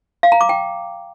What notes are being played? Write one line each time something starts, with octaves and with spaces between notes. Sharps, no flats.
F5
A#5
D6
G5